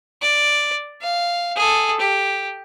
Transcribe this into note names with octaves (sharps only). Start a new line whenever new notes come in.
D5
F5
G#4 A4
G4